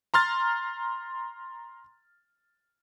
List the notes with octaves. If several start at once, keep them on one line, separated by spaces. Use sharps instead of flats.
A#5 C6 F6 A6